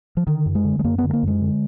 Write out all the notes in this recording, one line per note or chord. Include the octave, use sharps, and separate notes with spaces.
F3
D3 D#3
F#2
G#3
D3
G#3
F#2 A#3
B3
D3
G#3
A#3
F#2 G#3
D3